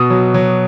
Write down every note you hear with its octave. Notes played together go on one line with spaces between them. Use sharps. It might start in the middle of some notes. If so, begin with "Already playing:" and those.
Already playing: B2 D#6
F#3
F#3